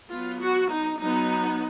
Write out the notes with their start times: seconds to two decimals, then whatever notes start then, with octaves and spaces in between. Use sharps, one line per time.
0.10 F#3 B3 F4
0.40 F#4
0.71 D#4
1.00 F#3 B3 D#4